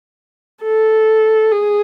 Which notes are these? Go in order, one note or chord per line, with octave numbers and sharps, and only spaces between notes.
A4
G#4